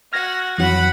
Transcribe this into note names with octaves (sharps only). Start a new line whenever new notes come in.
F#4 F#5 F6 G#6 A#6
F2 E3 F#3 F#5 B5